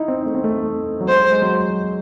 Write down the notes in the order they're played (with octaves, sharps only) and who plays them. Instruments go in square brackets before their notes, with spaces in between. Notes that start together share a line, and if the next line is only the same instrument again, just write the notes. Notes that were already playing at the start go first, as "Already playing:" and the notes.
Already playing: [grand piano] D#4 E4
C4
A3
C4
A3
F#3
[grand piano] G#3 [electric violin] C5
[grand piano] G#3
F#3